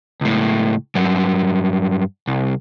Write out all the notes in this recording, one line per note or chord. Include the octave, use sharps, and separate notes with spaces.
C#2 A2
G2 F#3
C2